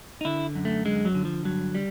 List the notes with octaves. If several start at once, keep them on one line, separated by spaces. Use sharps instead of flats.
D#4
D3 E4
F#2
A3
D3 G#3
F#3
D3
F3
G2 F#3
G3